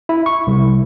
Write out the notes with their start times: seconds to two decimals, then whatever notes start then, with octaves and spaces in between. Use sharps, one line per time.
0.09 E4
0.26 C#6
0.47 C2